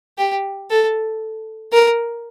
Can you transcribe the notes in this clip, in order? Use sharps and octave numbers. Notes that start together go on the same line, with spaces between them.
G4
A4
A#4